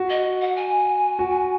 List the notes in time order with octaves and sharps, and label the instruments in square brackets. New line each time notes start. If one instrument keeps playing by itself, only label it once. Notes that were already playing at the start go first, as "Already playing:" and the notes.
Already playing: [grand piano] F#4
[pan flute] D#5
F#5
G#5
[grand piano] F#4